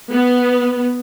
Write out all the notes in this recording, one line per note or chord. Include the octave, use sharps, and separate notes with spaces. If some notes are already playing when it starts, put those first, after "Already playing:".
B3